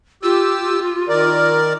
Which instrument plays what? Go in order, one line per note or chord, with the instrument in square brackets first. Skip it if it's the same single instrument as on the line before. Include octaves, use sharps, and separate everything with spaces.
[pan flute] F4 [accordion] G4 E6
[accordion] D#3 A#4 D5